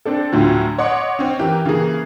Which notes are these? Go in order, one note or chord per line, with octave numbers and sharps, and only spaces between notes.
C4 D4 A4
D2 A2 F3 F#3
C#5 D#5 F#5 C6 D6
C4 C#4
E3 G4 A#4
C#3 E3 A#3 G#4